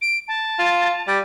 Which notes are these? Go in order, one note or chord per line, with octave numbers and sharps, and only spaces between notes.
D7
A5
F4
G3